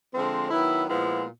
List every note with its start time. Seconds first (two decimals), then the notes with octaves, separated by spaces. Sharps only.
0.14 D3 F3 G#3 C4
0.51 D#3 F#3 B3 E4
0.89 A#2 F3 G#3 B3 E4